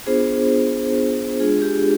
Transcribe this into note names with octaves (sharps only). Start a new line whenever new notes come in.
B3 D4 F4 G#4 C5
G#3 D4 F4 G#4
G4